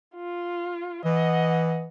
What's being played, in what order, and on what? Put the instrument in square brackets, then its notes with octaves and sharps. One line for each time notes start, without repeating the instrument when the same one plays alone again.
[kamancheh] F4
[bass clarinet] E3 [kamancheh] D#5 F#5